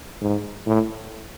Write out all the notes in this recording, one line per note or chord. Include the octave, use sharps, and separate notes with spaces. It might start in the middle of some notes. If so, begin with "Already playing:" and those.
G#2
A2